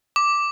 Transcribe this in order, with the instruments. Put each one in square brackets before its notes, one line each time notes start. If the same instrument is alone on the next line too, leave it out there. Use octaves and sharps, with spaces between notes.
[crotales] D6